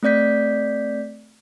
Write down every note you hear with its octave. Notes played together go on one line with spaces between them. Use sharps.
A3 C4 D5 G6 B6